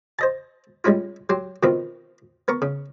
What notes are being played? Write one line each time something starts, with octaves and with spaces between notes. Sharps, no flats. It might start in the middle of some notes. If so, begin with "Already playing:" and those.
C5 D#5 A5
G3 G#3 C#4 E4 F4
F#3 G4 C6
B2 D#3 C4 E4 F4
B3 A#4 C#6
C#3